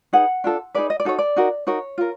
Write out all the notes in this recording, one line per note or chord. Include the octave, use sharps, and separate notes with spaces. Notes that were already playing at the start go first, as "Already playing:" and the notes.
D#4 G#4 B4 F#5
D4 F4 A4
D#4 G#4 B4 D5
D#5
D5
D#4 F#4 A4 C#5
D5
D#4 F#4 A#4
D#4 F#4 A#4 C#5
F4 A#4